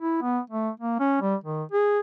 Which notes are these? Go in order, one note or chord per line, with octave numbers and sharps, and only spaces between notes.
E4
B3
A3
A#3
C#4
G3
D#3
G#4